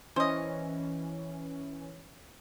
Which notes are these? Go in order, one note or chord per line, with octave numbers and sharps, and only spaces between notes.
E3 C#4 C5 D#5